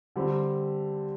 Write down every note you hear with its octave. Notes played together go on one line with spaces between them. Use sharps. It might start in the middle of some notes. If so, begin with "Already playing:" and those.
D3 G3 C4